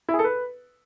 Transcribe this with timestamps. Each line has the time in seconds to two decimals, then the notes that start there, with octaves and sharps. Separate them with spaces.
0.09 E4
0.14 G#4
0.19 A4
0.24 B4